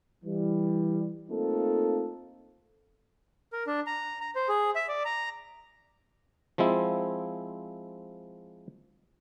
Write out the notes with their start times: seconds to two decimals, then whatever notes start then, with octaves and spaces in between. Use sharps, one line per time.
0.24 E3 G3
1.29 A3 A#3 C4 D#4 F4 A4
3.53 A#4
3.67 D4
3.87 A#5
4.21 A#5
4.35 C5
4.48 G#4
4.75 E5
4.88 D5
5.05 A#5
6.58 F3 G#3 C4 E4